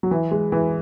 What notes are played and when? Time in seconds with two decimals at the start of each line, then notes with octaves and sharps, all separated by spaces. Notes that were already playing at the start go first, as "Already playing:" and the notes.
0.03 F#3
0.11 E3
0.31 G#3
0.52 E3